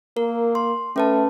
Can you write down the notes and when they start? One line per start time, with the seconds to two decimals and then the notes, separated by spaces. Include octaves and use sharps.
0.17 A#3 A#4
0.55 C6
0.96 A3 C#4 B4 A5